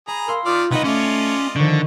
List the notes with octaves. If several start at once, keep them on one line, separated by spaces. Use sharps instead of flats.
G#4 A#5 B5
A#4 F5 C6 E6
D#3 F4 D5 F6
C2 D#4 B4 D#5 F#5
A3 C#4 F4 D5 D#5
D3 D#3 F3 C#6